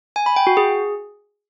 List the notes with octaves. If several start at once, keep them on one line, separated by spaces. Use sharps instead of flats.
G#5
B5
G5
F#4
G#4